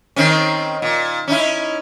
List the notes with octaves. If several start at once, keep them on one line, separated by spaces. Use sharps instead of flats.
D#3 C4 C#4
A#2
C#4 D#4 E4